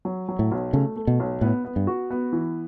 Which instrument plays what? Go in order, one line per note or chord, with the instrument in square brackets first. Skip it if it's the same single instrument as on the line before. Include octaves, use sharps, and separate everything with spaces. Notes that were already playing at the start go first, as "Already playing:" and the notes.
[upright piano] F#3
F#3
[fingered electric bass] A2
[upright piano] B1
[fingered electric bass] C#3 [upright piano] A3
[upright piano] A3
[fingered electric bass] B2
[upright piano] B1
[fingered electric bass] A2 [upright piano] B3
[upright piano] B3
[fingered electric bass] G2
[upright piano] F#4
B3
E3